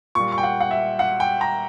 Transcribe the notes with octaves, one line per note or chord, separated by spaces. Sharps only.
A#2 G3 C#6
C#6
G5
F#5
F#5
E5
F#5
G5
A#5